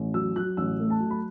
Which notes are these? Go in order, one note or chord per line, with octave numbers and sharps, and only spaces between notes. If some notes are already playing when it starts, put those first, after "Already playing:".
Already playing: A1
F#3 E6
F#3 F#6
A1 E6
A3
A5
F#3
B5